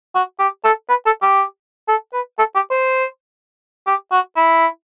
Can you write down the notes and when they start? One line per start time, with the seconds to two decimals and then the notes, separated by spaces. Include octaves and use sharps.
0.15 F#4
0.40 G4
0.65 A4
0.89 B4
1.06 A4
1.22 G4
1.88 A4
2.13 B4
2.39 A4
2.55 G4
2.71 C5
3.87 G4
4.12 F#4
4.36 E4